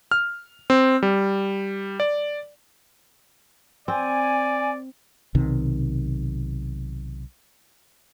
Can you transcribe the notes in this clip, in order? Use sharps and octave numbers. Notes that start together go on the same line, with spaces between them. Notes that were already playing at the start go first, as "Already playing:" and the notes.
F6
C4
G3
D5
C4 D5 G#5
B1 C3 D#3